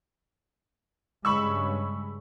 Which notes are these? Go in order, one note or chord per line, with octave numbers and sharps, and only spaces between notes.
G2 C#3 G#3 B5 C#6 E6